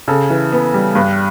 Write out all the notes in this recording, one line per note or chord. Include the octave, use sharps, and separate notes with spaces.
C#3 A4
E3
B3
G3
G2